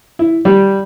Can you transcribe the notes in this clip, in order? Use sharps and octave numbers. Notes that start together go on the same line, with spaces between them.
E4
G3